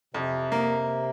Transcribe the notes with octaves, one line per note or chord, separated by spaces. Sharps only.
F2 C3
A#3